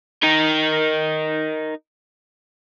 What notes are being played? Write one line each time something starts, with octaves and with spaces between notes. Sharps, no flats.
D#4 A#4